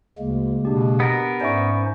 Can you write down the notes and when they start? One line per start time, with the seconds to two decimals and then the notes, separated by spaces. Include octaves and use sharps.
0.18 D2 C#3 G#3 A#3
0.65 B2 D4 G4
1.00 B3 A#4
1.41 G#2 C#4 D#4 C5 D5 E5 C#6